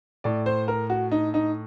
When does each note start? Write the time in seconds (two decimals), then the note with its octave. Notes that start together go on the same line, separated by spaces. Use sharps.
0.24 A2 D5
0.46 C5
0.68 A#4
0.90 F#4
1.11 D#4
1.34 D#4